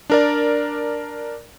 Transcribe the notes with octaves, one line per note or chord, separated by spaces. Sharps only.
D4 A#4 D5